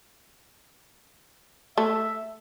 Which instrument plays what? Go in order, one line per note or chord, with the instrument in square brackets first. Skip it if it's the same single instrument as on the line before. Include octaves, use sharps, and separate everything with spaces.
[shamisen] A3 [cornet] E5